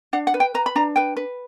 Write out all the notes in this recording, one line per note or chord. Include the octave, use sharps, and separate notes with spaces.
D4 F#5
F#5
B4
G5
B4 A#5
B5
D4 A#5
B4 G5
B4